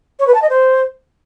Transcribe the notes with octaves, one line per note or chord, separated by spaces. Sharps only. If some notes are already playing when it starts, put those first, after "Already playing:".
C#5
B4
A5
D#5
C5